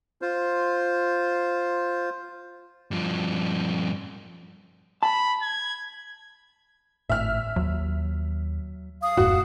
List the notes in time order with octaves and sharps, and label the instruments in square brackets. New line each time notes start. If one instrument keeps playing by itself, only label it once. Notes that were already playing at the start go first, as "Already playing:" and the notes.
[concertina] F4 C5
[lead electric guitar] G2 F3
[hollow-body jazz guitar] A5 [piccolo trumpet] B5
[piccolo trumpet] G#6
[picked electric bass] G#1 A2 [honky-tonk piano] E5 F6
[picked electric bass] D#2 [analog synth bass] F#3
[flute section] F5 D#6
[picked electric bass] D#1 F#2 [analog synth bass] A2 [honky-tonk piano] F#4